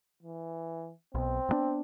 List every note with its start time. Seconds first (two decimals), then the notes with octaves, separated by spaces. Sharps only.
0.23 E3
1.15 B1 B2 C4
1.49 G2 B3 D4